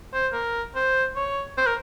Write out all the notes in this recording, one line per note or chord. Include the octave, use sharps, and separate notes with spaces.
C5
A#4
C5
C#5
C5
A#4